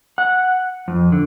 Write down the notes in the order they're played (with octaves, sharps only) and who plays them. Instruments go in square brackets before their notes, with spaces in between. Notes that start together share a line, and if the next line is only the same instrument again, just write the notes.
[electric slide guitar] F#5
F2
D3